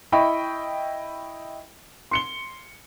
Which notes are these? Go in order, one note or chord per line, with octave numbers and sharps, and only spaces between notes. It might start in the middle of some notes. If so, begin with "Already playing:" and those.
E4 D#5 E5 G5 B5 C#6
C6 C#7 G7